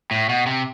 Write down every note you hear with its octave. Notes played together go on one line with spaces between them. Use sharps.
A2
B2
C3